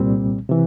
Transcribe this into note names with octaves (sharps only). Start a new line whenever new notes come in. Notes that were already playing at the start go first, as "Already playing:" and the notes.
Already playing: C2 A#2 G3 C4
C3 E3